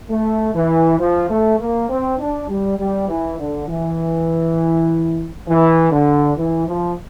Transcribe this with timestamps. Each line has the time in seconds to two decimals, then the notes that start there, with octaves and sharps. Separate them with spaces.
0.10 A3
0.55 E3
0.99 F3
1.29 A3
1.59 A#3
1.89 C4
2.19 D4
2.49 G3
2.79 G3
3.08 E3
3.39 D3
3.68 E3
5.48 E3
5.92 D3
6.38 E3
6.67 F3